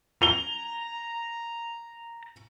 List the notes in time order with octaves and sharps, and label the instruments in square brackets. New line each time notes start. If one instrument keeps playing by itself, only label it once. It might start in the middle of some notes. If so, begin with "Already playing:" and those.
[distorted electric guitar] A#5 [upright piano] F7 G7